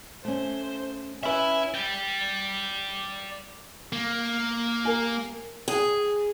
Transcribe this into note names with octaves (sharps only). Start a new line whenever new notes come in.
A3 C#4 C5
C#4 E4 B4 E5 G#5
D5 G5
A#3
G4 A#4 G#5
G#4